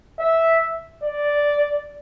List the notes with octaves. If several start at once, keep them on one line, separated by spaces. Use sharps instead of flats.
E5
D5